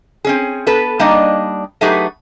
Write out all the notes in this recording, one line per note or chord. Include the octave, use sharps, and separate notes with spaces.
C4 C#4 G#4
B3 A4 B4
G3 A#3 D4 D#4 D5 D#5
F#3 A3 D#4 G4 G#4 B4